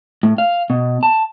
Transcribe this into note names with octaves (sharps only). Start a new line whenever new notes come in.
A2
F5
B2
A5